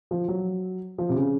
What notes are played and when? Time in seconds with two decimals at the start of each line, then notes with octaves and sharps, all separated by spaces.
0.11 F3
0.28 F#3
0.98 F3
1.09 C3
1.16 C#3